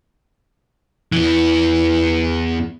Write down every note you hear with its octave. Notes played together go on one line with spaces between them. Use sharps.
E2 E3